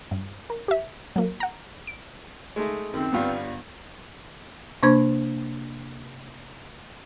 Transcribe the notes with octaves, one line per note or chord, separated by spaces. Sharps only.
G2
A#4
G4 E5
F#3 A#3
F#5 A#5
D7
G#3 A3 D#4
F#2 D#3 C4
G1 G2 G3 B3 F4
C3 A#3 D4 C5 B5 G#6